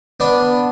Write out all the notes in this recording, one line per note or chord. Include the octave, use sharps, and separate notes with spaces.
B3 D4